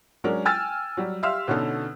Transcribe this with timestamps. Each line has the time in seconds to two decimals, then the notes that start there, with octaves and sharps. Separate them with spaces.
0.24 F#3 G#3 C#4 D4 A#4
0.45 G5 G#5 E6 F6 A6
0.97 F#3 G3
1.23 G4 E5 F5 C6 E6 F6
1.48 B2 D3 C#4 D#4 A4